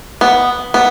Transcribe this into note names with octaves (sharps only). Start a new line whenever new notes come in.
B3
B3